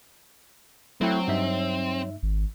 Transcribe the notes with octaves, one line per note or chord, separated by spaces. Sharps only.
F#3 A3 C4 E4 G5
G2 D#4 E5
G#1